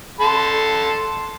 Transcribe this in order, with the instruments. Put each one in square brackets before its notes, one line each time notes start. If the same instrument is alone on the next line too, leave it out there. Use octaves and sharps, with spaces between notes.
[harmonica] A4 C6